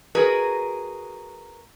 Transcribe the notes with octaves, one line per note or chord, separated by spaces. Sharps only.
F#4 G#4 A#4 B4 D#5